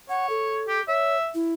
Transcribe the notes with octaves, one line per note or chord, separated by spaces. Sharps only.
C#5 F#5
A4
G4
C#5 E5
E4